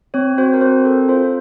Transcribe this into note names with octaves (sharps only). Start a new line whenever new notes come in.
C4 C#5
F#4 C5
A#4
C4 C5
A4 A#4
F4 C5